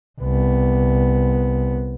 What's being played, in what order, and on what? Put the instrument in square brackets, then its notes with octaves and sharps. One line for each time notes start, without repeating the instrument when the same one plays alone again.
[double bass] C2 B3